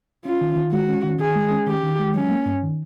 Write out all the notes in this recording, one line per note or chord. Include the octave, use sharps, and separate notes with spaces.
C#4 F4
D#3
D#3
G#3 F#4
C#4
D#3
D#3 G#4
G#3
C#4
D#3 G4
D#3
G#3
F#3 C#4
A#3
G2
D#3